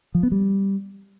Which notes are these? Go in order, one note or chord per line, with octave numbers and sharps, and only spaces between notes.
F3
B3
G3